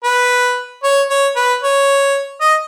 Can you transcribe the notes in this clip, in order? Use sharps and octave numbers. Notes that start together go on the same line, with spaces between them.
B4
C#5
C#5
B4
C#5
D#5